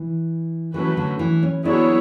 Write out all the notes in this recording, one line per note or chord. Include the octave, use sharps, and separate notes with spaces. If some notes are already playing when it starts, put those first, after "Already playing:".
Already playing: E3
E3 F#3 A3 C#4 F#4 B4
D3
E3
C#4
F#3 B3 D4 E4 G#4 C#5